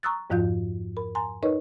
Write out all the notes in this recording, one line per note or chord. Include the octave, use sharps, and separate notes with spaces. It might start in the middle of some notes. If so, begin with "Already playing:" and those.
A#5 C#6 D#6 E6 F#6 A6
F2 G#2 F3 F4 F5 G6
A#4 B5
G#5 A#5 C6
D#4 A#4 B4 C#5 D#5